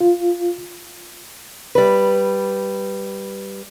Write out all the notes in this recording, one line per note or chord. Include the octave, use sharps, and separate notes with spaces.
F4
G3 B4